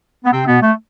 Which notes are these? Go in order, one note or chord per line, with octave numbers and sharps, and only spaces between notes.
B3
C3 C4
B2 B3
A3